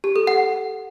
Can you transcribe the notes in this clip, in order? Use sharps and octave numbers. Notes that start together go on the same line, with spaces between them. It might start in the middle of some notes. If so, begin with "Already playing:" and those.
G4
A4
F#5